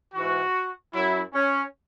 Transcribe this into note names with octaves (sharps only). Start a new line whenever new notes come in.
G#2 E3 F#4
F#2 F#3 E4
C#4